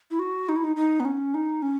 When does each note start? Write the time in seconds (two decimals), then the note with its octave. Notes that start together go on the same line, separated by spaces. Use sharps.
0.11 E4
0.19 F#4
0.49 D#4
0.56 E4
0.64 D#4
0.76 D#4
1.00 B3
1.05 C#4
1.34 D#4
1.62 C#4